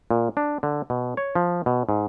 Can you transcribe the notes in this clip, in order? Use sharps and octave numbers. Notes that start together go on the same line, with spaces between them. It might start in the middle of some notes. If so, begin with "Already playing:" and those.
A#2
D4
D3
B2
C#5
F3
B2
G#2